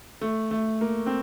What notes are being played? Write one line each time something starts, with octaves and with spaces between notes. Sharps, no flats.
A3
A3
A#3
C4